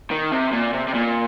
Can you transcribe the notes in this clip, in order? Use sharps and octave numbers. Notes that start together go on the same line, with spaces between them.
D#3
C3
A#2
C3
C3
A#2